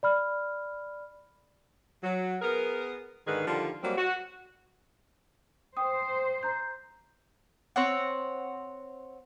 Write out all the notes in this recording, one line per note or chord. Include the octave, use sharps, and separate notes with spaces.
D5 B5 F6
F#3
B3 G#4 A#4
G#2 D3 D#3 G#4 B4
D3 D#3 F3 G3
F#3 G3 A#3 C4
F#4
C5 G5 D#6
A#5 G6
C4 C#5 F#5